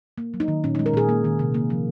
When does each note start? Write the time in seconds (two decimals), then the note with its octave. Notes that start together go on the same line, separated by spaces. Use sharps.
0.18 A#3
0.34 F#3
0.40 D#4
0.48 D#3
0.64 A#2 C#4
0.75 G#3 D#4
0.86 A#4
0.94 A#2 G#4
1.09 A#3
1.24 D#3
1.39 C3
1.54 A#3
1.70 F3